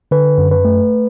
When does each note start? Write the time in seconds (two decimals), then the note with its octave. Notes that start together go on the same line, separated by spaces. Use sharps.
0.11 D3 B4
0.38 F#2
0.51 B4
0.65 A3